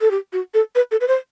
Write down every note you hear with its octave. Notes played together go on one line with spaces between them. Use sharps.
A4
G4
F#4
A4
B4
A4
B4
C5